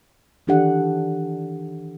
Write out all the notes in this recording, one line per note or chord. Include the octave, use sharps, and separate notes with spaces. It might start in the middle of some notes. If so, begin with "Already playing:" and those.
D#3 E3 D4 G4 A4 F#5